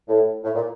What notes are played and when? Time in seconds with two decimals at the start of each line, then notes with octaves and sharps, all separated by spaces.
0.08 A2
0.44 A2
0.55 A#2